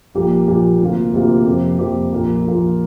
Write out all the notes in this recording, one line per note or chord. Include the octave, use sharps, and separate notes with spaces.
A#1 A#2 G3 A#3 G4
A#1 A#2 G3 A#3 G4
D2 C3 A#3 F4
D2 C3 A#3 F4
F2 C3 A#3 G4 C5
F2 C3 A#3 G4 C5
A#1 A#2 A#3 F4 A#4
A#1 A#2 A#3 F4 A#4